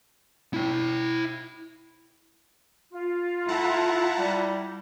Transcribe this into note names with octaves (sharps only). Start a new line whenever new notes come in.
E4 G5
F4
E4 A4 F#5 A5 A#5
G3